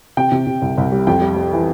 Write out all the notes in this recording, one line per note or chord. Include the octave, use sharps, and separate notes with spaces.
C3 G5
C3
C3
C2
C2
G3
F2 G5
G3
G3
E3